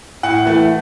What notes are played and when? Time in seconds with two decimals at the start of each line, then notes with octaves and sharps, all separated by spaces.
0.23 A2 F#5
0.46 E3 A3